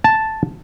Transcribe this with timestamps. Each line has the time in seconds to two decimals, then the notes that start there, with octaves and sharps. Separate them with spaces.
0.04 A5